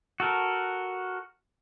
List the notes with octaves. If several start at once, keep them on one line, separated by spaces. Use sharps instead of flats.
F#4 A4 A#4